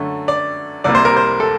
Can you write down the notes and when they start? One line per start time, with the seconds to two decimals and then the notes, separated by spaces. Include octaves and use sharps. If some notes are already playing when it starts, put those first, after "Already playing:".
Already playing: F#2 D3 A3
0.28 D5
0.84 C2 C3 G3 A#3 D5
0.95 C5
1.05 A#4
1.17 C5
1.40 A4